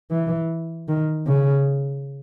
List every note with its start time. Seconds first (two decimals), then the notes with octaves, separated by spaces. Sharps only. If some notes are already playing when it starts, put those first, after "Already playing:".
0.11 E3
0.88 D#3
1.27 C#3